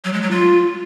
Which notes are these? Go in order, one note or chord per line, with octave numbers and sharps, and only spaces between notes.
F#3
G#3
F#3
F4